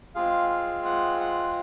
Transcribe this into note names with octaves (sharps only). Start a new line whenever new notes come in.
G#3 C4 F4 G#4 F5
F5
F#5
F#5